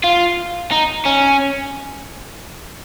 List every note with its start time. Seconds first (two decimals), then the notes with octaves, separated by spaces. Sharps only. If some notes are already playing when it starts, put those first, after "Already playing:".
0.04 F4
0.71 D#4
1.05 C#4